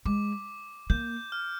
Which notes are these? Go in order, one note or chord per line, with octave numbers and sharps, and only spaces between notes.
G#3 D6
A#3 G6
F6